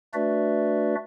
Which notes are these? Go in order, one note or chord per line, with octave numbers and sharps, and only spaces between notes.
A3 D4 F#4 B4 D5 E5